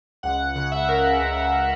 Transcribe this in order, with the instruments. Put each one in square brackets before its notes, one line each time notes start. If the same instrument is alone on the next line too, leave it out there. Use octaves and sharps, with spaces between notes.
[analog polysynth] C#2 F#5
C#3 F#5
E5
C#3 A#4
C#2